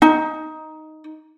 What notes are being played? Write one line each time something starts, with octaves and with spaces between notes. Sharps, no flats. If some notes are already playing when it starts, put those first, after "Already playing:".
D#4